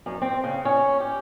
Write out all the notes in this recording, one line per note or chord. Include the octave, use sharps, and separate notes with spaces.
F#2
C4
C#3
C#4
G4